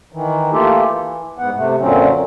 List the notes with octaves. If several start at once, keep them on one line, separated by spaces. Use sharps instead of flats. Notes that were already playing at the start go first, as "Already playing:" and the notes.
D#3 E3
E3 A3 A#3 F4 G4 A4
E3
G#2 B3 F#5
C3 A3
F#2 A#2 D3 F#3 C4 C#4